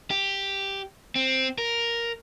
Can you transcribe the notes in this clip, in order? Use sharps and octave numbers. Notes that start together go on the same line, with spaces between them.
G4
C4
A#4